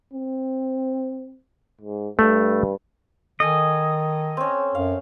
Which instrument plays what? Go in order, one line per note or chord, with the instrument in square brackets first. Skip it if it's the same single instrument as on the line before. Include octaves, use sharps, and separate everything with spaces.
[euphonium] C4
G#2
[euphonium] G2 [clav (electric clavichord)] A3
[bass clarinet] D#3 [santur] A4 G#5 [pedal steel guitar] D#5
[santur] C4 C#4
[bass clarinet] F#2 [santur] F5